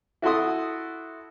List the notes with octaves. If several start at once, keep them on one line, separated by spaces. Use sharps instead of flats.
E4 F#4 A4 C6 D#6